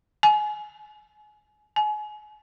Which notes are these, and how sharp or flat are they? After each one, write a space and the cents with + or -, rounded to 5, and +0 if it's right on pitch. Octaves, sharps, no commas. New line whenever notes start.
G#5 +25
G#5 +30